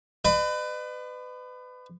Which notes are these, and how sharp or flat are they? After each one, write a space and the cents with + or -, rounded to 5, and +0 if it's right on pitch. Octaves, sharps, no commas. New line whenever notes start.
B4 +30 D#5 -45